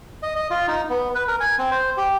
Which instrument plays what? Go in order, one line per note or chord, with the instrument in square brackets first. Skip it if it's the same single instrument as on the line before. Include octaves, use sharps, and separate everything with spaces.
[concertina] D#5
D#5
F4
D#4
B3
B4
A#4
G#5
C4
C5
G4